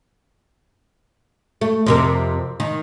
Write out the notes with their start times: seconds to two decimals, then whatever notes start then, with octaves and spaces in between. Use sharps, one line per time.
1.61 A3
1.86 F2 C3 A#4
2.60 D#3